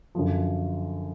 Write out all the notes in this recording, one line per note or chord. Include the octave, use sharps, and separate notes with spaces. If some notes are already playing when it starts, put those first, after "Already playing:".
F#2 D3 F3